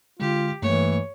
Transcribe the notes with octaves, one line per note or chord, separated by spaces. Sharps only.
D3 G#3 F4 G4
G2 E3 A3 A#3 C#5